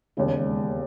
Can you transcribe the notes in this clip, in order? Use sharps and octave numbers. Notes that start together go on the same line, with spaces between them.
E1 D#2 C#3 G#3